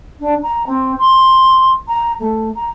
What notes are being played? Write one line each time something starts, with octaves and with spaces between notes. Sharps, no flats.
D4
A#5
C4
C6
A#5
A3
A#5